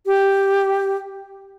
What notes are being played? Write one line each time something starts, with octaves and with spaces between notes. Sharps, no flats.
G4